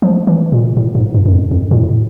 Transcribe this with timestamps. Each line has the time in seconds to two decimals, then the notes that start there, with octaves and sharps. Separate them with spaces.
0.02 F3
0.27 E3
0.52 A#2
0.77 A2
0.95 G#2
1.14 G2
1.26 F#2
1.33 F2
1.51 F2
1.71 A#2
1.76 A2